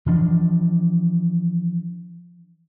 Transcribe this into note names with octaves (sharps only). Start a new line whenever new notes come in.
E3 F3 D4